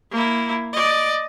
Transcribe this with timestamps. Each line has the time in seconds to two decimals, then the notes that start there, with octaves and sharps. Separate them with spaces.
0.12 A#3 E4
0.73 D5 D#5